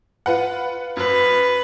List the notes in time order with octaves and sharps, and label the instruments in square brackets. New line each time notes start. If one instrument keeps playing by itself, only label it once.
[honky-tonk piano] F4 B4 F#5
[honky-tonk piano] F#2 [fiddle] B4